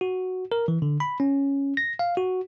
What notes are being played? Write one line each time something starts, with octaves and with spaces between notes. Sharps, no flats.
F#4
A#4
E3
D3
B5
C#4
A#6
F5
F#4